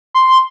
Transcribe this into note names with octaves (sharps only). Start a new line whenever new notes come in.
C6